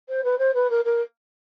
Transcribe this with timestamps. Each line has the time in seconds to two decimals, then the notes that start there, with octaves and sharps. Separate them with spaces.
0.09 C5
0.24 B4
0.38 C5
0.54 B4
0.70 A#4
0.85 A#4